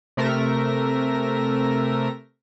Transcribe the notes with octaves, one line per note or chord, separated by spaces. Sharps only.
C3 A3 A#4 E5 A#6